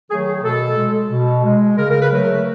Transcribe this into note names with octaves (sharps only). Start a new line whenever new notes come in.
D#3 F#3 A3 G#4
G#4
B2 A4
G#3
B2
G#3
C#3 A#4
A#4
B4
F#3 A3
A#4